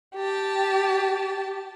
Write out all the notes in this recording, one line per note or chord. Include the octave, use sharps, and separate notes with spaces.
G4 A5